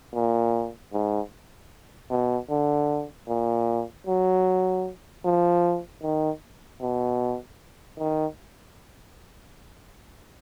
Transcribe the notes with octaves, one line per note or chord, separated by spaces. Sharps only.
A#2
G#2
B2
D3
A#2
F#3
F3
D#3
B2
D#3